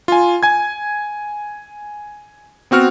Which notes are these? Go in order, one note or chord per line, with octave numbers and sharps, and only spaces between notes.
F4 G#5
G#5 G#6
B3 C4 F#4 F6